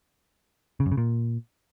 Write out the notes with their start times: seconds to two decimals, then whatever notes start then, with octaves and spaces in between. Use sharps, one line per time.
0.80 C#3
0.86 F#2
0.92 C#3
0.97 A#2